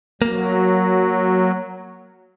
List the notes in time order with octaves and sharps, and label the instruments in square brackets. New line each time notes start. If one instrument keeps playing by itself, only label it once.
[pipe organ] F#3 [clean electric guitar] A#3